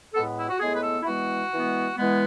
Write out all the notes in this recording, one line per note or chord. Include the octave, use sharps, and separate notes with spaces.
A2 G#3 B3 A4
E4
F#4
A2 G#3 B3 G#4
B4
A4
E4
E3 G#3 B3 F#4
E3 G#3 B3
E3 G#3 B3